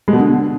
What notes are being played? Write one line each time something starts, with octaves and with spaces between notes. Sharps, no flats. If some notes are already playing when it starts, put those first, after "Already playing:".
G#3
B2
D3